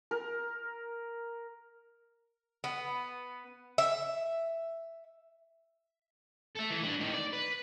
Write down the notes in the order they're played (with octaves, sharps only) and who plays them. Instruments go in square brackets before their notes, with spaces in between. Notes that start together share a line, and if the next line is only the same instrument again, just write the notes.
[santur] A#4
[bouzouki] B3
E5
[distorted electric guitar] A4 E5
E3
D4 B4
A2 D#3
D5
B4